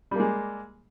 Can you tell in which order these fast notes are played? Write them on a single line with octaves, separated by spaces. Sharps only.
G3 A#3 G#3